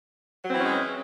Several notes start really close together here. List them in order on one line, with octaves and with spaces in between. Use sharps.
F#3 C4 E3 C#4 G#3